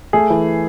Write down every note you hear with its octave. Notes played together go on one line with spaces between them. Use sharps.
A3 G#4
E3